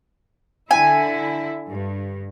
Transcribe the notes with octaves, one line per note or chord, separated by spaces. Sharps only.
D3 E4 G#5
G2